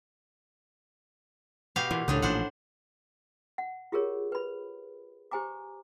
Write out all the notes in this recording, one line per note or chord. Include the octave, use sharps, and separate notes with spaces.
B2 G4 F5
A#2 E3
C#2 A2 C#3 D4 D#4
A1 A#2 F3 D4 C5 F#5
F#5
F4 G4 G#4 A#4 C#5
B4 B5
G4 C5 G#5 A#5 D6